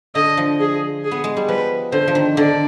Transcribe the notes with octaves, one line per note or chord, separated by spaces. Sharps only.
D3 D#5
F3
G#4
G#4
B3
G#3
G3
F3 B4
D3 C5
F3
D#3
D3 D5